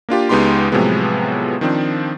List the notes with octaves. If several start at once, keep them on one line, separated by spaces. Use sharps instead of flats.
A#3 D4 F4 G4
C#2 G#3 B3 D#4 G4 C6
A2 C3 F3 F#3 G#3 B3
D#3 F3 C4 D4